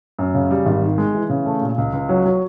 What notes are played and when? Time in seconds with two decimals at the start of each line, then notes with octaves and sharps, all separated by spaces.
0.19 F#2
0.34 C#3
0.51 G3
0.66 G#1
0.82 D#3
0.98 G#3
1.15 E3
1.29 C#3
1.46 A3
1.61 A#2
1.78 C#2
1.93 C#2
2.09 F#3
2.26 F#3